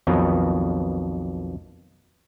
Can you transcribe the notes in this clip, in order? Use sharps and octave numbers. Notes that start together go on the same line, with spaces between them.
B1 F2 B2 D#3